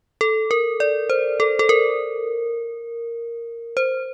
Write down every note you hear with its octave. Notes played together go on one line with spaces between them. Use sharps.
A4
A#4
D5
C5
A4
A4
A#4
C5